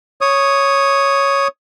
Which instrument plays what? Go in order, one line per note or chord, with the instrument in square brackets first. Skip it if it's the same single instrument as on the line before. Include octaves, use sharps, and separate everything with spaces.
[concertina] C#5 D#6